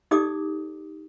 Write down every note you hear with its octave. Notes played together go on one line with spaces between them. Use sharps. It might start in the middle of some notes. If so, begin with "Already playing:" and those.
D#4 G4 A4 D5 D6 D#6